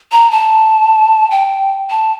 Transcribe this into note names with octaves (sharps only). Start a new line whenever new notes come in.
A#5
A5
G5
A5